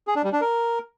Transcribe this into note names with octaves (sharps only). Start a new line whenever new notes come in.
G#4
D4
G3
D4
A#4